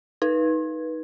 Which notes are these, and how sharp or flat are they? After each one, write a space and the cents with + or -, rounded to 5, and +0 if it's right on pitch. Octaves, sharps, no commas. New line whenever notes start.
D#4 +15 B4 -20